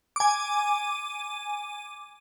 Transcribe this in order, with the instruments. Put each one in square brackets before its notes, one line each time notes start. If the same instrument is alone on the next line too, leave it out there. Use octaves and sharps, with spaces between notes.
[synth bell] G#5 D6